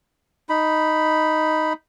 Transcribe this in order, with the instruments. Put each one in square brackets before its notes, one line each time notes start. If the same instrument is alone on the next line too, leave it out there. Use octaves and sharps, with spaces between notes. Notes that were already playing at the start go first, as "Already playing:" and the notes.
[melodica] D#4 B5